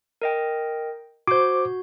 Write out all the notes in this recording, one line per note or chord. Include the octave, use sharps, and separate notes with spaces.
A#4 D#5 G5
F#4 C5 D6 G6